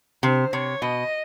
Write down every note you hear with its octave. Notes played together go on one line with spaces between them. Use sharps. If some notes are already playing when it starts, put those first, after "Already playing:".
C3 C5
C3 C#5
B2 D#5